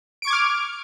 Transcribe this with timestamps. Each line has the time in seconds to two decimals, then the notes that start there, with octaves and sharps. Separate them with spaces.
0.22 D7
0.25 C#6
0.27 G#6
0.30 D6
0.33 F6